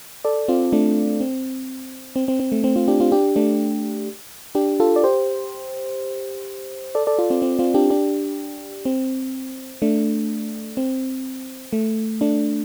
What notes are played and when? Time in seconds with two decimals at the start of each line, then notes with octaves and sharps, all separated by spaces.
0.25 A4 D5
0.48 C4 F4
0.73 A3 D4
1.21 C4
2.16 C4
2.28 C4
2.40 C4
2.52 A3
2.64 C4
2.76 C4 F4
2.88 D4 G4
3.00 C4 F4
3.12 D4 G4
3.36 A3 D4
4.55 D4 G4
4.80 F4 A4
4.96 D5
5.04 G4 C5
6.95 A4 D5
7.07 A4 D5
7.19 F4 A4
7.30 C4 F4
7.42 C4
7.59 C4 F4
7.74 D4 G4
7.90 D4 G4
8.85 C4
9.82 A3 D4
10.77 C4
11.73 A3
12.21 A3 D4